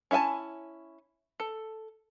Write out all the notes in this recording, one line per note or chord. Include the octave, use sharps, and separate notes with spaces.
C#4 E4 E5 G#5 A5
A4